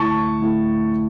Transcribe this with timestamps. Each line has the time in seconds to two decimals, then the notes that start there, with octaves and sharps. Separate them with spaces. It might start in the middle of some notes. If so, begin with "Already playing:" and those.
Already playing: D3 A3 E4 A5 C#6
0.40 D3 A3 E4